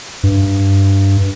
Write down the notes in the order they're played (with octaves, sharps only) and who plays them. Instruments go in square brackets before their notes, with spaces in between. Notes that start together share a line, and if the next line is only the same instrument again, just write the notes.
[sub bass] G2